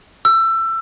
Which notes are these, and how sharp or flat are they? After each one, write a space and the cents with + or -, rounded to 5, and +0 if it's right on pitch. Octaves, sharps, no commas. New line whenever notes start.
E6 +20